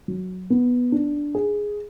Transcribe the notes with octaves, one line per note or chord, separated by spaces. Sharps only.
F#3
B3
D4
G#4